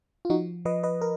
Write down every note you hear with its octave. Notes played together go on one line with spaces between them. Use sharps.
F4
F3 D#4 F#4
F3 B4 D#5
B4 D#5
A#4